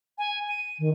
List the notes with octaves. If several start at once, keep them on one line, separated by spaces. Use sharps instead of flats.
G#5
D#7
D#3